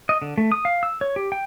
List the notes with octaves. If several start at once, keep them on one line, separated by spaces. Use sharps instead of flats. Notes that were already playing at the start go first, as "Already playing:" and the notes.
D#5
D3
A3
D#6
F5
E6
C#5
G4
G5